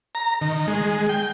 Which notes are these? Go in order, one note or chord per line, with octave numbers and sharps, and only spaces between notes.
A#5
D#3
G#3
G5